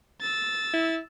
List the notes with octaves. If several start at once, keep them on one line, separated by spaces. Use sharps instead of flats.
E6 A6
E4